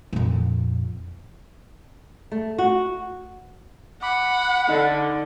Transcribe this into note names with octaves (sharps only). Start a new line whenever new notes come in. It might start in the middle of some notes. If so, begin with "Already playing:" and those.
A#1 F2
A3
F#4
F#5 B5 D6
D3 D#4 D#5